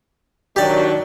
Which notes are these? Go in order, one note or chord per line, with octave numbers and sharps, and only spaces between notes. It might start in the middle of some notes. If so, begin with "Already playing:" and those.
D#3 F#3 D4 G4 D5